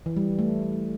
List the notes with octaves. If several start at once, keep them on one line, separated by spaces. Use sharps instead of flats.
E3
G3
A3